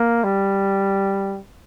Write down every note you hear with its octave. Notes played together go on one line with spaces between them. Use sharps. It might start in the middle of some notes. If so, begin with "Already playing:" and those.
Already playing: A#3
G3